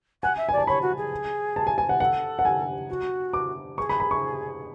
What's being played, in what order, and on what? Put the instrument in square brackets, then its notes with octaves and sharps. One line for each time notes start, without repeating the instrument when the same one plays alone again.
[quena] F#5 [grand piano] G#5
[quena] E5
[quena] D5 [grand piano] G#5
[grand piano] A5
[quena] C#5 [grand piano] B5
[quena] F#4
G#4
[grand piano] A5
G#5
G#5
F#5
[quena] A4 [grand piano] F#5
[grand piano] F#5
G#5
[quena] F#4
[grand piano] D6
[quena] G#4 [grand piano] C#6
[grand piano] B5
B5
C#6